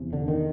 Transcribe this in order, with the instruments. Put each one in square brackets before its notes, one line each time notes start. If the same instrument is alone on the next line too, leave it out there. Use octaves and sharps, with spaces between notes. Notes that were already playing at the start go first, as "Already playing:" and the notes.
Already playing: [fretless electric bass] E2 C3
D3
D#3